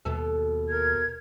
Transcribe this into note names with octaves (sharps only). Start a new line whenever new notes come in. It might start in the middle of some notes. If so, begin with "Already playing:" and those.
D#2 B2 A4
A#4 G#6